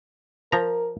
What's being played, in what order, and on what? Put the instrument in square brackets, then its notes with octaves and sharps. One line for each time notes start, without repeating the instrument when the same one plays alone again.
[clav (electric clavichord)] F3 A#5 [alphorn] A#4